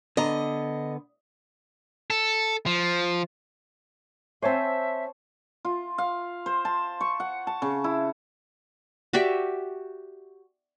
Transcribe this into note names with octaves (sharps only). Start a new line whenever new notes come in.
D3 B3 D#5 A#5
A4
F3
C4 C5 C#5 E5 G#5 A5
F4
F5
C5
A5
C#6
F#5
A5
C#3
E4
F#4 G4 D5 E5